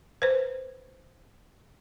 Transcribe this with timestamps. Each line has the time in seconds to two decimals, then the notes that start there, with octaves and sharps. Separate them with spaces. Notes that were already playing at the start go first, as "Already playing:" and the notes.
0.22 B4 C5